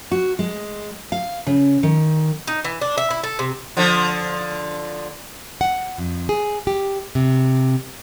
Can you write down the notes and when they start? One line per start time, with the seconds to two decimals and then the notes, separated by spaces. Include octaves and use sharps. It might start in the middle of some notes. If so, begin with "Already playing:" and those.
0.11 F#4
0.39 G#3
1.12 F5
1.47 C#3
1.83 D#3
2.47 D#4
2.64 E3
2.81 D4
2.98 E5
3.10 E4
3.24 A4
3.39 C3
3.77 D3 F3
5.61 F#5
5.98 F2
6.29 G#4
6.67 G4
7.15 C3